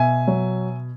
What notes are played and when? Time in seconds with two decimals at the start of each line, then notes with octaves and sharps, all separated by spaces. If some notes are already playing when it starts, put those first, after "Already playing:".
Already playing: B2 E5 G#5
0.27 F#3